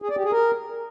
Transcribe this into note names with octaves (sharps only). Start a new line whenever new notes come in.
G#4
D5
G4
G#4
A#4